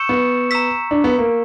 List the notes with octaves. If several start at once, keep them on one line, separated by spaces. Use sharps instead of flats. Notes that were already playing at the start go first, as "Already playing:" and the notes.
Already playing: C#6 E6 G6 C#7 E7
B3
A#5 E6 B6
D4
B3
A#3